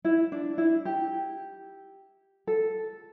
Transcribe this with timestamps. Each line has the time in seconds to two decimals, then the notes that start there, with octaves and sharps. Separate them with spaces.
0.05 E4
0.32 D4
0.58 E4
0.85 G4
2.47 A4